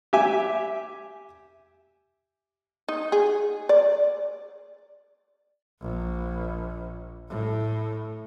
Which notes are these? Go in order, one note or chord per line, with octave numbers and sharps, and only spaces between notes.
G4 E5 G#5
D#4
G#4
D5
A#1
A2